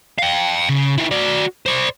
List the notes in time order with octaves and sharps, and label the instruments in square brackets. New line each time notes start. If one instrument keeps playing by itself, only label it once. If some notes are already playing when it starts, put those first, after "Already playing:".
[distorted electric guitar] F5 G5
C#3
D#3 E4
F#4 D5
C5 D5